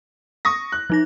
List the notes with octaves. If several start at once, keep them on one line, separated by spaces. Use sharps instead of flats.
C#6 D#6 A#6
F#6
F3 D#4 A#6